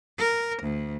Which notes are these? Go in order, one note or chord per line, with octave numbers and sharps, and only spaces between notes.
A#4
D2